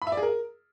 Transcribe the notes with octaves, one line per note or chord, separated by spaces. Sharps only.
B5
E5
D5
G#4
A#4